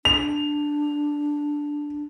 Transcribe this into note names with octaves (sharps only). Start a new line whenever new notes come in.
D4 F7